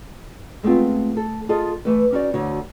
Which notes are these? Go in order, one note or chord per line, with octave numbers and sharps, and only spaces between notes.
G#3 A3 B3 C4 F4
A4
F4 G#4 A4 D#5
E3 A3 B4
C#4 D#4 F#4 D5
D2 D3 F#4 C#5